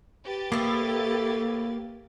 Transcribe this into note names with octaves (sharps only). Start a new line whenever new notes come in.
G4 B4 A6
A2 A#3 E4